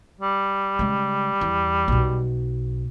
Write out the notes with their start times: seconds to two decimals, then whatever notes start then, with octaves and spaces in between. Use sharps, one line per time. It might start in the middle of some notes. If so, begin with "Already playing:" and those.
0.21 G3
0.79 C#3 G#3
1.41 E2
1.88 B1 B2